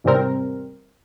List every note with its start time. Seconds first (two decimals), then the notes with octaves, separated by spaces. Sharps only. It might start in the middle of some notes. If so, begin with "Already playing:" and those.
0.04 E2 G#2 C3 G3 C4 A#4